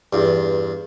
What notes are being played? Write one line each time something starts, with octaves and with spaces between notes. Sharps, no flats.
E2 G2